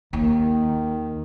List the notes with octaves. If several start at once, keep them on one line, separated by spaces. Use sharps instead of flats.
D#2 D#3